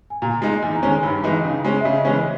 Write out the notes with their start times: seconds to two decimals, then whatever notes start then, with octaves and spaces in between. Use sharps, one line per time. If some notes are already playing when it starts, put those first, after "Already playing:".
0.10 G#5
0.22 A#2 A#5
0.42 G#3 D#4
0.62 E2 G#5
0.76 A#5
0.82 D#3 G#3 C#4
0.90 G#5
1.03 G2 G5
1.24 E3 G#3 D#4
1.45 C#3
1.64 G#3 C#4
1.81 E5
1.85 C#3 D#5
2.05 E3 G#3 C#4